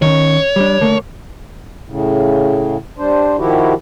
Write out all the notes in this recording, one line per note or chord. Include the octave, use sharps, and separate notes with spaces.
D#3 C#4 C#5
G3 D4
D3 A3 A#3
A2 C#3
G3 D4 C5
D#3 F3 E4 F#4 G4